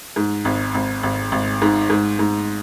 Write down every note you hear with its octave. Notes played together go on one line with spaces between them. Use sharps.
G#2
G#1
G#1
G#1
G#1
G#2
G#2
G#2